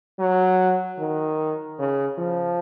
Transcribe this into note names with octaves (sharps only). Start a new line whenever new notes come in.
F#3
D#3
C#3
F3